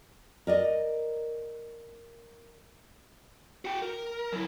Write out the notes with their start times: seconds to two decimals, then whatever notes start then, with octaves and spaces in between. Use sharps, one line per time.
0.47 A#4 D5 D#5
3.65 F#4 G5
3.82 A#4
4.32 F#3 E4